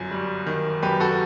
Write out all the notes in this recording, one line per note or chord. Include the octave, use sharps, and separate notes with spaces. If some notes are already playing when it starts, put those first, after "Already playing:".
Already playing: G1 F#2
G3
D#3
F#2 G4 B4
F#4 A4